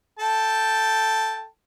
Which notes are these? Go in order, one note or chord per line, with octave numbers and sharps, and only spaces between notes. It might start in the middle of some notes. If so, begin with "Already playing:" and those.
A4 G5 A5